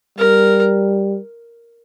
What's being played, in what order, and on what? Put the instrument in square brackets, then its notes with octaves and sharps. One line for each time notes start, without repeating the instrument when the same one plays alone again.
[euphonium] G3 [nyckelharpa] A#4